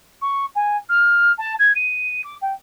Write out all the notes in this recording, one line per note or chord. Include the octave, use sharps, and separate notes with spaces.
C#6
G#5
F6
A5
G#6
D#7
D6
G5